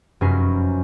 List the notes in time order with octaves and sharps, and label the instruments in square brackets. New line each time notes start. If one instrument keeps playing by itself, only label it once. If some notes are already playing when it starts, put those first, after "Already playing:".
[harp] F1 F#2 C#4 A#4 B4 C7